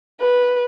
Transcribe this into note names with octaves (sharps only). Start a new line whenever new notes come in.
B4